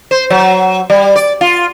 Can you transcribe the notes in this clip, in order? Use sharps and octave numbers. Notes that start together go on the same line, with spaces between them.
C5
F#3
G3
D5
F4